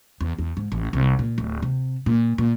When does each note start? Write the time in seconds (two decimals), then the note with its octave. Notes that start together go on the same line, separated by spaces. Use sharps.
0.21 E2
0.39 E2
0.57 G#2
0.72 A1
0.93 C2
1.19 A#2
1.38 D1
1.63 C3
2.06 A#2
2.38 A#2